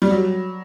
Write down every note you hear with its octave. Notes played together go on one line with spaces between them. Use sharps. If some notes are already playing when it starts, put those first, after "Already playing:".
G3
F#3